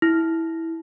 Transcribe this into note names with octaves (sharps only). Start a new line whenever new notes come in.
E4